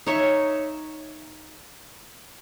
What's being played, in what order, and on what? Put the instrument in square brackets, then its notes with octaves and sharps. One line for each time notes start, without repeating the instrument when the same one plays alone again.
[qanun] D#4 C#5 E5